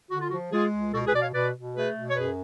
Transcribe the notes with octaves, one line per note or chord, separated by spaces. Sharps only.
D3 F#4
F4
F3 F#4
G#3 F4 G#4
C#2
B2 F#4 A4
G#4 B4
B2 D5
C#5 F5
B2 B4 D5
B2
A3 G#4 B4
B2
C#5
F#2 G#4 B4